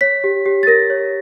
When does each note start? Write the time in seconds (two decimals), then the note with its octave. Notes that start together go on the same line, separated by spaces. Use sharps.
0.01 C#5 B6
0.24 G4
0.46 G4
0.63 A6
0.67 A#4 A#6
0.90 C#5